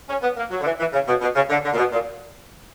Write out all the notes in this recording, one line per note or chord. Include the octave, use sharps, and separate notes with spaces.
C#4
B3
A#3
F#3
D3
E3
E3
C#3
B2
B2
C#3
D3
D3
A#2
B2
A#2